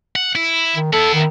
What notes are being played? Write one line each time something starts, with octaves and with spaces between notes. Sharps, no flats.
F#5
E4
D#3
B3 E4 A4
D#3